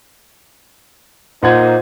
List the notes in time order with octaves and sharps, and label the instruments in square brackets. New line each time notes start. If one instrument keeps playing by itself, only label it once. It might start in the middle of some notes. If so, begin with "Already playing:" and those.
[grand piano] A#2 F#5 G#6 [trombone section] A#3 D#4 C5